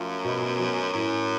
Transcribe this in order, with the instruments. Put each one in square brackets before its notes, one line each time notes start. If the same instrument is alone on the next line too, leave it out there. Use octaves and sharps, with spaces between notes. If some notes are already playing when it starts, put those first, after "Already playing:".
Already playing: [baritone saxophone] F#2 [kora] F3 A3 F4
[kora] B2
F#3 C#4
[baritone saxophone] F#2 [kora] A2